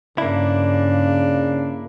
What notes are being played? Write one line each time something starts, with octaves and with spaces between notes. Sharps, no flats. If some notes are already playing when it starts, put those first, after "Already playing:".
G2 C#3 A#3 D4 E4